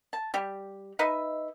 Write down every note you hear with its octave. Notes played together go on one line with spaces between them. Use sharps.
A5
G3 G4
D#4 B4 D#5 E5